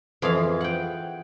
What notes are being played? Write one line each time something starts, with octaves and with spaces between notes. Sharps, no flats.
F2 E3 G#4 F5
F#5 G5